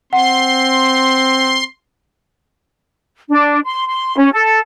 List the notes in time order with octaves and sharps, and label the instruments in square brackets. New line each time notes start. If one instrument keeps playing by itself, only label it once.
[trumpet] C4 [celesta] F#5 [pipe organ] C6
[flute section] D4
C6
C6
C#4
A4